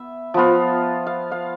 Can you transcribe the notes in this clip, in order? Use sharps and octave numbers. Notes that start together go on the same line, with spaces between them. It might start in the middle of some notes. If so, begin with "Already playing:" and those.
Already playing: B3 E5
F3 B3 F4
F5
F5